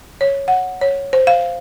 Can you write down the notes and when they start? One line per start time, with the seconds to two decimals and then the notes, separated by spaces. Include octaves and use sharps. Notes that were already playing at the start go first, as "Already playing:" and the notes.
0.21 C#5
0.48 F#5
0.81 C#5
1.13 C5
1.27 F5